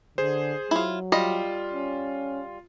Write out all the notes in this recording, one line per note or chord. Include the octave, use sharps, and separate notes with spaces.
D3 G#4 C5
F#3 E4 F4
G3 F4 D#5
C#4